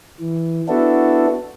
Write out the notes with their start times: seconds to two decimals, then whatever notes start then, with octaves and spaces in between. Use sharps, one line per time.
0.20 E3
0.68 B3 D4 E4 F#4 A4